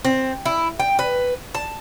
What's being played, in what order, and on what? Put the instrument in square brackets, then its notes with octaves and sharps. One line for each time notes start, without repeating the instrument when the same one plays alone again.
[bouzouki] C4
E4
G5
B4
A5